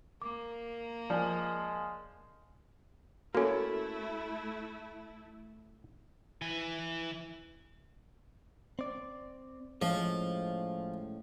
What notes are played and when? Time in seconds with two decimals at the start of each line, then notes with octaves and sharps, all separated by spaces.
0.22 A#3 D6
1.10 F3 G#3 D5 G#5
3.35 A3 A#3 C#4 E4 F#4 A4
6.42 E3 G#5
8.79 C4 D5
9.82 A2 F3 G#3 C#4